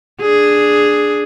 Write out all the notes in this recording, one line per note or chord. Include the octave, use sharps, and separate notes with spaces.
D4 G#4